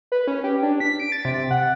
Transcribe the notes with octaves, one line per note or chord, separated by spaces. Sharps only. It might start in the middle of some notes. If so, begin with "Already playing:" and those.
B4
C#4
G4
D4
B6
D7
A6
C3
F#5